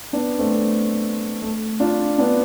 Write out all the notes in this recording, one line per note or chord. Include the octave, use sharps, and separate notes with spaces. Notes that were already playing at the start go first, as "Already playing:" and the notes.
B3 D4
A3 C4
A3
D4 F4
B3 D4